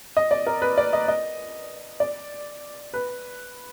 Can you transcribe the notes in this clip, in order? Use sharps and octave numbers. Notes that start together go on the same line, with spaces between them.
D#5
D5
A#4
B4
D5
D#5
D#5
D5
B4